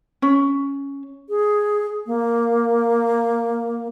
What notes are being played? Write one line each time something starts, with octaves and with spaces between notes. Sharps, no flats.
C#4
G#4
A#3